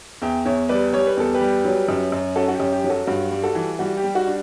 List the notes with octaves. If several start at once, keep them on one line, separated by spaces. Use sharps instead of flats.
E2 E5 G5
E2 C#5 E5
G3 B4 D5
G3 C#5
B4
E2 A4
G4 B4
G3
F#3
F#2
F#2
C#4 F#4 A4
F#4
G4
F#2
G4
F#3
F#4 A4
G2 F#4
G3
F#4 A4
E3
G3 F#4
G4
G3
F#4
D4